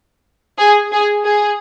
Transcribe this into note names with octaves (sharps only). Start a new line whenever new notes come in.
G#4
G#4
G#4